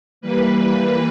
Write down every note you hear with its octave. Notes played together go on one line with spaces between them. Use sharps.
E3 G3 A#3 B4